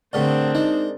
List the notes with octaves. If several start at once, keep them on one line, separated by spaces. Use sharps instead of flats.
A2 D3 A3 C4 D4 G#4 A#4 D5
G#3 D#4